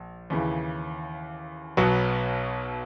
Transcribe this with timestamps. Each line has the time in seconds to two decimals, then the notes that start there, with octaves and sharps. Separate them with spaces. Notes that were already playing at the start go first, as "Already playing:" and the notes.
Already playing: A#1
0.30 D#2 C#3 E3
1.77 B1 B2 F#3 B3